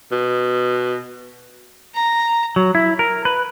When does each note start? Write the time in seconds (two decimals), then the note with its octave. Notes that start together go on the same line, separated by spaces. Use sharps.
0.12 B2
1.95 A#5
2.56 F#3
2.75 E4
2.99 A#4
3.25 B4